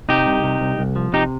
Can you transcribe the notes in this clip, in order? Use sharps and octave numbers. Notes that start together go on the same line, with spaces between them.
C3 D#4 G4
C2
C3
C2
C2
F3
C3 D#4 G4